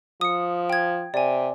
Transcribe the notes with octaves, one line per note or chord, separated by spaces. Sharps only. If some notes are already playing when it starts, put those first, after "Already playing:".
F3 D#6 C#7
G5 G#6
C3 D5 G#5